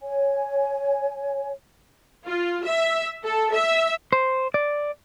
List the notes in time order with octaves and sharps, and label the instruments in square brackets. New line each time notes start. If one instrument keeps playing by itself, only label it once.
[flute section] C#5 G#5
[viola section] F4
E5
A4
E5
[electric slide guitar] C5
D5